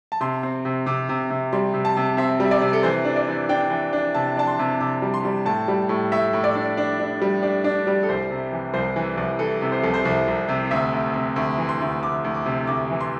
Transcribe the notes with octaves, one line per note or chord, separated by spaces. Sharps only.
A5
C3 C6
C4
C3
C3 D6
C3
C3
G3 C6
C3
A5
C3
C4 E5
G3
E5
D5
C3
A4
E3 C5
D4
D5
E3
D4 G5
E3
D4
C3 A5
D4 A5
C6
C3
C3 D6
G3
C6
G3
A2 A5
G3
A2
A2 E5
A2
D5
D4
D4
D4
G3
D4
D4
G3
A4
C2 C5
C3
E3
C2 C5
E3
C2
E3 A4
C3
C5
C2 A4
C5
C2
C2
C3
D2 E5
D2
C3
D2
E3
C6
D2
D2 D6
D2
D6
C3
D2 D6
E3
C6